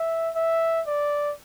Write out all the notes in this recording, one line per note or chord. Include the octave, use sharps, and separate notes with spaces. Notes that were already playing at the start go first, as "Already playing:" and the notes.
Already playing: E5
E5
D5